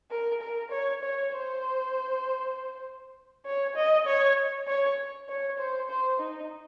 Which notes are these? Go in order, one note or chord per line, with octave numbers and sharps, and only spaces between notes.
A#4
A#4
C#5
C#5
C5
C#5
D#5
C#5
C#5
C#5
C5
C5
D#4